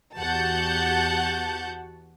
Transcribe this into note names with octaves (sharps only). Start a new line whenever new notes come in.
E2 F#4 G4 F#5 A5 G6